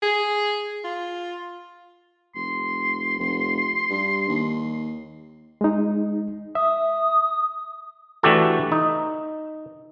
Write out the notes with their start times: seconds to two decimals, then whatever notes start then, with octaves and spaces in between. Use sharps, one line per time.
0.03 G#4
0.84 F4
2.35 F1 C6
3.18 F1
3.90 G2
4.28 D#2
5.61 G#3 D#4
6.55 E5 D#6
8.23 E3 A3 D4 F#4 G4 A4
8.72 D#4